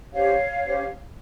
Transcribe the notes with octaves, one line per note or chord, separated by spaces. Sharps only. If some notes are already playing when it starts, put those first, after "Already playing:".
C#4 G4 C5 C#5 F5
C#4 G4 C5